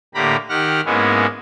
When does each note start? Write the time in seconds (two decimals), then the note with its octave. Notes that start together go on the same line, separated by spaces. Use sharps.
0.15 A2 D3 A#3 G4 A#5 B5
0.49 D#3 G4 F#5 F6
0.85 G#2 G#3 A#3 B3 C#4 E4